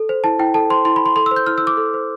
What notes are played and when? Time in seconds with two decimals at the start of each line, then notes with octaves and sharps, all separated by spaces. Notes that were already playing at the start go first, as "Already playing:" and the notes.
Already playing: A4
0.09 C5
0.24 E4 A5
0.39 E4 G5
0.54 A4 A5
0.70 C5 C6
0.85 E4 C6
0.96 B5
1.01 E4 C6
1.16 A4 C6
1.26 E6
1.31 C5
1.36 G6
1.46 E4 F6
1.58 E6
1.62 E4
1.67 D6
1.77 A4
1.94 C5